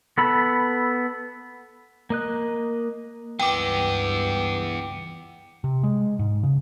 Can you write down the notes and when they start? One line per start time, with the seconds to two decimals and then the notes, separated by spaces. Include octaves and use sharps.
0.18 B3 A4 B5
2.10 A#3 D#5 F#6
3.39 C#2 G2 E3 B3 G5 D6
5.64 C3
5.83 G#3
6.19 G#2
6.43 C#3